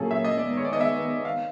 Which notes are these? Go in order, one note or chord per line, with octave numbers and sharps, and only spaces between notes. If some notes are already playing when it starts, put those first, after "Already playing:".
Already playing: A#2 F#3 A#3 C#4 G#4 A4
E5
D#5
D#3 G#3 B3 D5
C#5
D5
D#5
E5
F5